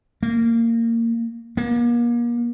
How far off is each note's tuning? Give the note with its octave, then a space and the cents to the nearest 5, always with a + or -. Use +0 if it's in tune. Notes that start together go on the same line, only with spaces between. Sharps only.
A#3 -20
A#3 +35